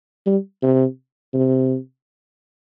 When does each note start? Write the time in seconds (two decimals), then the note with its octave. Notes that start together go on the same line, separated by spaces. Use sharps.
0.27 G3
0.63 C3
1.34 C3